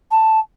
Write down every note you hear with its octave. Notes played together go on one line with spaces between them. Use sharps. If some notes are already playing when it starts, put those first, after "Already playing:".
A5